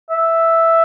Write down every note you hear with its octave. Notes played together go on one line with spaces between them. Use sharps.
E5